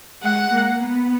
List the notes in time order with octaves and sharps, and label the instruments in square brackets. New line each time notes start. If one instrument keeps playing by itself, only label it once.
[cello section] G#3 [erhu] F#5
[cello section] A#3
B3